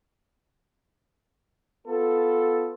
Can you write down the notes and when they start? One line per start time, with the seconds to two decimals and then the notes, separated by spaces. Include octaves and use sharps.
1.87 B3 F4 A4